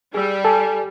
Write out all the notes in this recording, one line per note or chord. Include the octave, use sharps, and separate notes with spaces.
G3 G#4 E6
A4 G#5